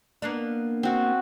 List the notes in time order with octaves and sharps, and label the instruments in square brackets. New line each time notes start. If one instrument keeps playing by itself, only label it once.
[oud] A#3 B3 D4
[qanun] C4 F#4